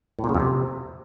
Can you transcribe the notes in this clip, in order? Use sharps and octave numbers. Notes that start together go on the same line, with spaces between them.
A2
A#2
C#3
F2
C3